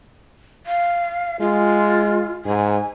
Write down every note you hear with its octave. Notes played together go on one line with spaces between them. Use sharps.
F5
G#3 F4
G#2 G#5